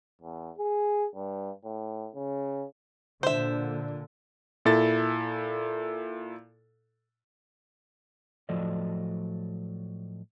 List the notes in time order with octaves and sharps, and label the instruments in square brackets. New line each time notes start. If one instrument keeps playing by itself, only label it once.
[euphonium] E2
G#4
G2
A2
C#3
[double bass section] A#2 D3 [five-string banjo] C5 E5
[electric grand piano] A#2 E4 A4 A6
[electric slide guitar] A2 F3 F#3 A4 D5 D#5